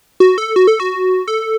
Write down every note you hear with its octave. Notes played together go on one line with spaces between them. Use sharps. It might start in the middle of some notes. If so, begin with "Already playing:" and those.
F#4
A4
F#4
A4
F#4
A4